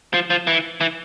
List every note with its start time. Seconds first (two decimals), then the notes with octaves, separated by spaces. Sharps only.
0.14 F3
0.30 F3
0.47 E3
0.81 E3